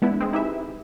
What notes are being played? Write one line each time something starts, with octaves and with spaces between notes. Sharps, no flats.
G#3 B3 D4 E4
G#3 C4
D#4 E4 G4 G#4 B4 E5